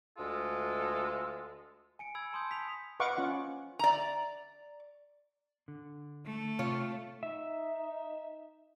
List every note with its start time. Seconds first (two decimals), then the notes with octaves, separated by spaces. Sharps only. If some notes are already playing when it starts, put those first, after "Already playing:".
0.18 D2 G#3 F4 A4
1.99 G#5 C#7 D7
2.15 B5 E6 G#6
2.33 A5 C6 D#6 G6
2.51 B6 F7
3.00 B4 D#5 F5 F#5 C#6 D6
3.17 C#4 F4 F#5
3.79 D5 A#5
5.68 D3
6.26 A3
6.59 C3 F4 C#5
7.23 D#4 E5